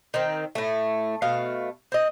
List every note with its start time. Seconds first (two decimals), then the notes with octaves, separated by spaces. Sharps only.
0.14 D#3 C4
0.55 A2 A3
1.22 B2 A3 F5
1.92 C4 D#5